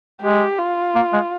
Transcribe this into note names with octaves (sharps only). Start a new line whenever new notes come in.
G#3 G4
F4
A#3
G#3